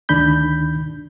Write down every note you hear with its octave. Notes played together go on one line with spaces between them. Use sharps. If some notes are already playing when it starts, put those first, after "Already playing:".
D2 D#3 D4 B5 G6